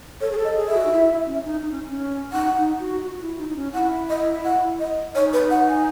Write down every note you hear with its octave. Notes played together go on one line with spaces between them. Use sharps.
A4 C#5
G#4
A4
D#5
G#4
E5
F#4
D#4
E4
C#4
D#4
D#4
C#4
C#4
D#4 F#5
D#4
F#4
F#4
E4
D#4
D#4
C#4
E4 F#5
D#5
F#5
D#5
D#4 C#5
B4
F#5
G#5